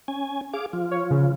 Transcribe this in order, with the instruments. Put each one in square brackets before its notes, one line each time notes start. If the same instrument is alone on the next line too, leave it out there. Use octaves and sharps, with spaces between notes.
[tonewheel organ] C#4 G#5
G#4 F5 D6
F3 F4
[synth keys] C#5
C#3